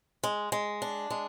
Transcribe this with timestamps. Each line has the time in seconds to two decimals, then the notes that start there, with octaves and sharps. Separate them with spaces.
0.24 G#3
0.52 G#3
0.82 D4
1.10 G#3